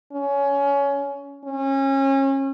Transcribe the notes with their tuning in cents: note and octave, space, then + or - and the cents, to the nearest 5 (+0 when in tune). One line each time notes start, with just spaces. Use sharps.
C#4 +20
C#4 -30